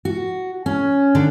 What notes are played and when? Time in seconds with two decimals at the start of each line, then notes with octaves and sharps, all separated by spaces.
0.05 F#4
0.66 C#4
1.15 D3